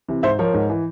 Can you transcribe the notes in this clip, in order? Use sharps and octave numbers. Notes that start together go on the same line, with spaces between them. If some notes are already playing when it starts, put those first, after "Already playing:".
C3 E3
G#2 C5 E5
F3 A#4 C#5
G#2
E3